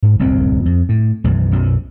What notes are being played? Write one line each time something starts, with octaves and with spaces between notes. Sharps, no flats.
G#2
D1 C2 F#2 C4
F2
A2
B1 F#2 E3
B1 F#2